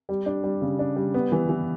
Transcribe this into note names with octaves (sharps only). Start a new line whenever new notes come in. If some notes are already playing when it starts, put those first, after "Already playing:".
G3
D4
G3
C#3
D4
G3
B3
E3
E3